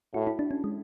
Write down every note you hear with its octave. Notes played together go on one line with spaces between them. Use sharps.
A2 F#4
E4
D4
C#4
G#3